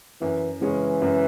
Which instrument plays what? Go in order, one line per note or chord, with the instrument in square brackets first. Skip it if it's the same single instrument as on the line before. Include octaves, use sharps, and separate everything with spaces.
[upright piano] F#2 [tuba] E3
[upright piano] C#3 G#3 C#4 [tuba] E3
[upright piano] F#2